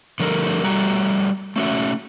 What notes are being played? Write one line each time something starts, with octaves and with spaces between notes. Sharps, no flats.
D3 F3 G3 A3 A#4
G3 A3 F#4 A#5
A3 C#4 F#4 E5